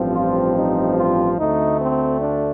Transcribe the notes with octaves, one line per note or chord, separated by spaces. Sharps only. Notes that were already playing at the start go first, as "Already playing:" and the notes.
Already playing: A1 G2 F3 C4
F4
D#4
F4
D2 D3 A3 C4 D#4
C4
D4